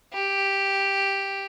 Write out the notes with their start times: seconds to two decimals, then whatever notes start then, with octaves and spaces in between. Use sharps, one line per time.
0.14 G4